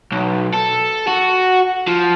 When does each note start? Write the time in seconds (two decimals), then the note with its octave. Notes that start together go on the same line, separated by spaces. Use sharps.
0.12 B1
0.53 A4
1.07 F#4
1.88 F3